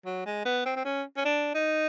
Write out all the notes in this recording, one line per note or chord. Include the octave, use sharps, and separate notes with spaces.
F#3
G#3
B3
C4
C4
C#4
C#4
D4
D#4